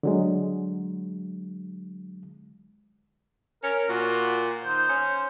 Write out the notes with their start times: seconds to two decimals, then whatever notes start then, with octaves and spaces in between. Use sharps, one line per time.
0.03 D3 F#3 G#3
3.63 C#4 A#4
3.89 A#2 F#4
4.64 D#3 C5
4.89 C#4